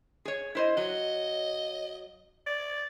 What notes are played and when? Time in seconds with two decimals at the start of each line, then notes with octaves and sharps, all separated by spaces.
0.25 G#4 C#5
0.55 E4 C5 D#5
0.77 F#3 D#5
2.46 D5